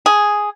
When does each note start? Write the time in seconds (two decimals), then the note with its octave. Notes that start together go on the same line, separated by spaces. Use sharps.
0.06 G#4